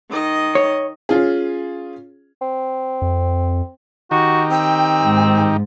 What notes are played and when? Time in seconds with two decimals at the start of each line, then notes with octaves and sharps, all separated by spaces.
0.10 D#3 D#5
0.55 C#5
1.09 C#4 F4 G#4
2.41 C4
3.02 F2
4.11 D#3 D#4 F#4 G4
4.51 C4 G5
5.01 G#2